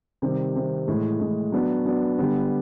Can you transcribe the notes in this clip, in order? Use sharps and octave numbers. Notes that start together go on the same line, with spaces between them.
C3 D#3 G3
C3 D#3 G3
A2 E3 G#3
A2 E3 G#3
F#3 B3 D4
F#3 B3 D4
D3 G3 B3